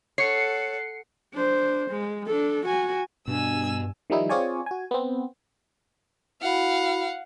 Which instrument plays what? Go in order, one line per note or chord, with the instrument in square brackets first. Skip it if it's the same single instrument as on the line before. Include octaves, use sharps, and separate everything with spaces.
[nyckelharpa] A4 F#5 [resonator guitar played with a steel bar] C#5 [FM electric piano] C7 C#7
[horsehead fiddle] D4 C5
G#3
D4 A4
F#4 G#5
[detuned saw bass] G2 [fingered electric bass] B2 [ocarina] D4 [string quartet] G#5 E6
[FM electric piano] D#3 F3 G3 D#4 E4
C4 F4 G#4 C#5 D5 G#5
F#4 G#5
B3 C4
[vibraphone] E4 F#4 B5 [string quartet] F5 F#5